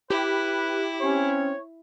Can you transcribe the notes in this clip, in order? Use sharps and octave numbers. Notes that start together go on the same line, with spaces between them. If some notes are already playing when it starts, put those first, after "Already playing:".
E4 G4 B4
C4 C#4 C#5